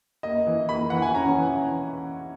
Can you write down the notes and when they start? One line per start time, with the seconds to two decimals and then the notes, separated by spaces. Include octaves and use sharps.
0.23 A#3 D#5
0.46 E3
0.69 A#3 B5
0.90 E3 F#5
1.02 G#5
1.15 C#4 A#5
1.37 E3